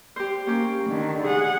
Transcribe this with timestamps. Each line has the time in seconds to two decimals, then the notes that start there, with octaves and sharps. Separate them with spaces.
0.16 G4 C5
0.47 A#3 C#4 G4
0.89 D3 D#3
1.25 G#4 F#5